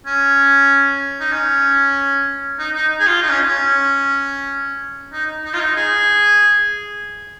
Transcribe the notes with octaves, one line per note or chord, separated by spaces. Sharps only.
C#4
D#4
C#4
D#4
D#4
G#4
F4
D#4
C#4
C#4
D#4
D#4
F4
D#4
G#4